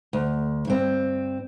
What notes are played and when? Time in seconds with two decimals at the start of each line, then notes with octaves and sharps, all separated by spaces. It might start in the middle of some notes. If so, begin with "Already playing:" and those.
0.13 D2
0.67 G2 C4